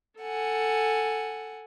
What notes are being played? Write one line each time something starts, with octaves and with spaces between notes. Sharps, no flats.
A4 F#5 G#5